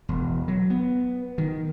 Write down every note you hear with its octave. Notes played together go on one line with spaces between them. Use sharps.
E1
F#3
B3
D#3